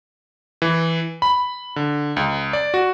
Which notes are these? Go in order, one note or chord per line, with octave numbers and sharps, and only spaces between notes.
E3
B5
D3
C#2
D5
F#4